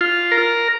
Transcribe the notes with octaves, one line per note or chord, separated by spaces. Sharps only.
F4
A#4